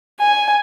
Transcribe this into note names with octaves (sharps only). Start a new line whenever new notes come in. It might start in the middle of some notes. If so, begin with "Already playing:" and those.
G#5